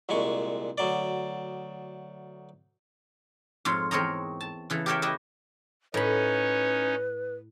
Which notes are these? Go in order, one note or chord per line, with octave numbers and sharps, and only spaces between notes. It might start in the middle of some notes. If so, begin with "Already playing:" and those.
C2 A#2 G#3 G#5 C#6
D2 F#3 D5
F2 G#2 F4 C#5
E2 C4 A#4 C#5 D#5 A#5
A5
C#3 E3 A4
G4 A4 A#4 C#5 E5 G5
E4 G4 B4 D#5 E5
A2 C#4 D#4 B4 C#5 B5